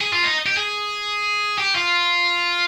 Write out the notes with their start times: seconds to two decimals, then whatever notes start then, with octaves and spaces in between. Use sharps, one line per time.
0.01 G#4
0.13 F4
0.24 D#4
0.46 G4
0.57 G#4
1.58 G4
1.75 F4